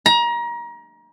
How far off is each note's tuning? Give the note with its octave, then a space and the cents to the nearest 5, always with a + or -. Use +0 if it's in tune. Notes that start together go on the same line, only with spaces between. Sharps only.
A#5 +30